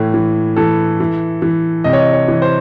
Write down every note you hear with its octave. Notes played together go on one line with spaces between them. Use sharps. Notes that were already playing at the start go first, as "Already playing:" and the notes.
Already playing: A2 E3
E3
E3 A4
E3
E3
C3 D#5
C#5
D#5
C#5
E3
C5